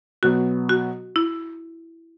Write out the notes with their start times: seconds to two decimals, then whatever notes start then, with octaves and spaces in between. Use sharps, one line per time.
0.23 B2 F#3 B3 F#4
0.69 F#4
1.16 E4